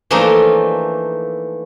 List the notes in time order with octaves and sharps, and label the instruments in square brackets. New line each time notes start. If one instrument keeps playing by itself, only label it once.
[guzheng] E3 F3 A3 A#3 D4 D#4